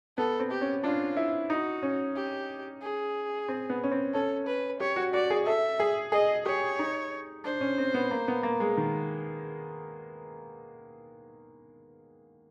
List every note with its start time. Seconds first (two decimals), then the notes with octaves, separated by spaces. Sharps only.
0.18 B3 A4
0.40 C4
0.51 G4
0.61 C#4
0.84 D4 F4
1.17 E4
1.50 D#4 F#4
1.83 C#4
2.16 G4
2.82 G#4
3.48 C4
3.69 B3
3.83 C#4
3.92 C4
4.14 C#4 A4
4.47 B4
4.80 G4 C#5
4.96 F#4
5.14 F#4 D5
5.30 G#4
5.46 A4 E5
5.80 G#4
6.12 G#4 D#5
6.45 G4 C#5
6.79 D#4
7.44 D4 C5
7.61 C#4
7.78 C4
7.94 B3
8.11 A#3
8.28 B3
8.43 A#3
8.60 G#3
8.77 D#3